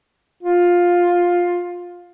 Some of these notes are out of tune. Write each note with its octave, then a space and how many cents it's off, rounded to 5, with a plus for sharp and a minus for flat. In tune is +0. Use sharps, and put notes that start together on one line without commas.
F4 +10